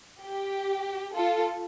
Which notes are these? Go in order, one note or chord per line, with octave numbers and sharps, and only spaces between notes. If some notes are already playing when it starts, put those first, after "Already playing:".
G4
F4 A4